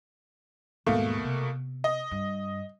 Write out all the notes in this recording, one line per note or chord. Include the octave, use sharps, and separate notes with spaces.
D#2 G#2 B2 A3 A#3
C3 B3
D#5
G2